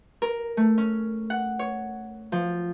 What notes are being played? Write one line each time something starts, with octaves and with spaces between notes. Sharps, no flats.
A#4
A3
C#4
F#5
C#5
F3